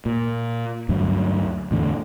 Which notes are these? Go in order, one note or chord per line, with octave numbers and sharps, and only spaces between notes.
A#2
D2 G2 F#3
E2 A2 D3